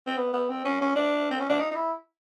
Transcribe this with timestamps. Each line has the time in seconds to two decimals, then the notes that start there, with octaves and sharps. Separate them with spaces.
0.07 C4
0.17 B3
0.33 B3
0.49 C4
0.65 C#4
0.81 C#4
0.96 D4
1.31 C4
1.40 C#4
1.49 D4
1.60 D#4
1.71 D#4
1.75 E4